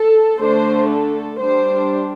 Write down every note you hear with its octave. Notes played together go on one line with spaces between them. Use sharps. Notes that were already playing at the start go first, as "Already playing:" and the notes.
Already playing: A4
D3 A3 D4 C5
A4
G3 D4 C5